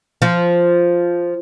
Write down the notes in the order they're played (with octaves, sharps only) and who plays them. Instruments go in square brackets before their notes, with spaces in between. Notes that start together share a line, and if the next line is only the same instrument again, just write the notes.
[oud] F3